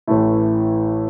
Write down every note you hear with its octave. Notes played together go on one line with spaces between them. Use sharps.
A1 A2 E3 A3 E4